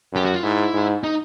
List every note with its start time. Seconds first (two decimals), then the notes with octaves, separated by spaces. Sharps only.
0.13 F#2 G4
0.25 F#4
0.34 F4
0.43 G#2 E4
0.73 G#2
1.04 D#4